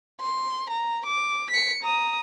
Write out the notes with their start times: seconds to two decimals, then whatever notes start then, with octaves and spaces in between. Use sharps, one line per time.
0.21 C6
0.70 A#5
1.06 D6
1.50 B6 C#7
1.83 A#5 D#6